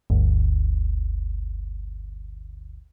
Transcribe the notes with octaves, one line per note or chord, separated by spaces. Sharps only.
G1 D2